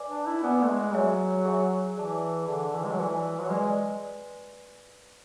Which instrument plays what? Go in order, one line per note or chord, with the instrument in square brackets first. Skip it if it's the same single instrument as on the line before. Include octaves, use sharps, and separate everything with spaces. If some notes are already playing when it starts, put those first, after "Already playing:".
Already playing: [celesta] B4 D5 G#5 D6
[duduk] D4
E4
[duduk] B3 [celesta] B4 D5 G#5 D6
[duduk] A3
G#3
[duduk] F#3 [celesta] G#4 C#5 E5 G#5
[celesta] G#4 C#5 E5 G#5
[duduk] E3 [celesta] G#4 D5 A5 D6
[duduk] D3 [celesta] G#4 D5 A5 D6
[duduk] E3
G#3
F#3
[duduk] E3 [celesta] B4 D5 G#5
[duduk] F#3
[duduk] G#3 [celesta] B4 D5 G#5